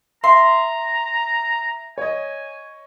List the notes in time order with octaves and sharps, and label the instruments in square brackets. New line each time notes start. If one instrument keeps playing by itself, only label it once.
[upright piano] E5 [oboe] A#5 [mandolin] C6
[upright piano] C#5 D#5 [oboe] G#5